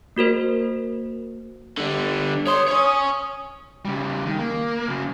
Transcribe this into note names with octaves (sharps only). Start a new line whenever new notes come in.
A#3 F#4 A#4 C5
D3 G3
C#5 C6 D#6
C#5 G#5
C#3 G3
D#3
A#3
C#3 F#3